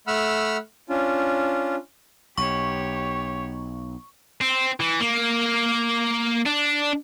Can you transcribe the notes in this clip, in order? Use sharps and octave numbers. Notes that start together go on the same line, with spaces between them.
A3 F#5 B5 E6 F6
C#4 D4 F4
B1 G4 C#5 C#6
C4
E3
A#3
D4